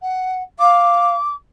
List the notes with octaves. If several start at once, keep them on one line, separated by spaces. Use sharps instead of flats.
F#5
F5 D6